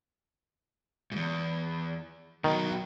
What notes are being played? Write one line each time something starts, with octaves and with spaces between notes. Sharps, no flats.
E2 G#2
B2 D#3 F#3